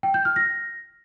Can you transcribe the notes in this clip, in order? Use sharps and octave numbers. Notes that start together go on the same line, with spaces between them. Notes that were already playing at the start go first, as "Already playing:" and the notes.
G5
G6
F6
A#6